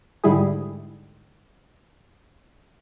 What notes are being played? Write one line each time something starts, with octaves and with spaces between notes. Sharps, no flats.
G#2 D3 G3 E4 G#4